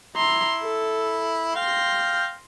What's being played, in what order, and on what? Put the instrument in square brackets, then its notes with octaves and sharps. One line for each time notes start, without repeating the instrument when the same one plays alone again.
[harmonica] E4 [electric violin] A#5 C6
[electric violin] A4
[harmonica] F5 G5 [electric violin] C6 A#6